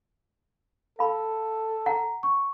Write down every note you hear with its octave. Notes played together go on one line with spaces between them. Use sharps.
A4 F5 B5
F#5 A#5
C#6